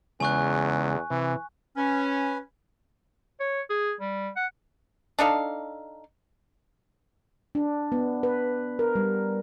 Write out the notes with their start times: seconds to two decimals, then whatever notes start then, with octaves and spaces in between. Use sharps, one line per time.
0.20 E2 C#3 G#3 G#5 C#6 F#6
1.10 C3 E3
1.77 C#4 B4 G#5
3.40 C#5
3.70 G#4
4.00 G3
4.36 F#5
5.19 D4 D#4 A4 F5
7.55 D4
7.92 B3
8.23 B4
8.79 A#4
8.95 G3